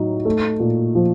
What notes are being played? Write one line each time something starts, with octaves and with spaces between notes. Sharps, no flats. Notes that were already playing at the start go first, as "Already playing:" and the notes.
Already playing: A2 F#3 D#4
A3
A#2
F3